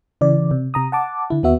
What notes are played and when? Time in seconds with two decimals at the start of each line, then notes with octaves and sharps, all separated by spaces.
0.21 C#3 E3 D5
0.51 C3
0.74 C3 A#5 D#6
0.92 F#5 A5 D6
1.30 D3 E4
1.43 D#2 B3 F#4 E5